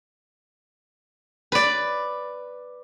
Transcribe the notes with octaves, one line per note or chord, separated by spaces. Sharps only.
B4 D5